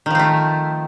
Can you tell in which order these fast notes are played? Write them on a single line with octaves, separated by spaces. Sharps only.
D#3 F3 C4 A3